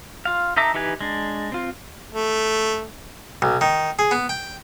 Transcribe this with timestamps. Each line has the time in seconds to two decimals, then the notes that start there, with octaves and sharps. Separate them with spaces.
0.25 F4 F5
0.57 D#4 A4 E5 A#5 D6
0.74 E3 D#4 G4 B4 G#5
1.01 G#3 D4
1.52 C4 F4
2.12 A3
3.42 B1
3.61 D#3
3.99 G#4
4.11 B3
4.29 G5